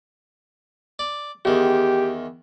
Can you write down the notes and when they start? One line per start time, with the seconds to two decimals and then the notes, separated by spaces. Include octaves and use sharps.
0.99 D5
1.45 E2 D#3 G4